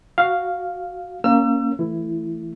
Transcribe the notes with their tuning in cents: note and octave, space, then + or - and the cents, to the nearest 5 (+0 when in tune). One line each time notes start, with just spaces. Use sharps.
F#4 +0 F5 +0
A#3 +0 C#4 +0 E6 +35
E3 +0 A3 +0 E4 +10